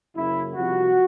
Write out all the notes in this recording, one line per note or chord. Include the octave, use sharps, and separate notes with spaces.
F#1 F#2 C#3 E4
C2 C3 F3 F#4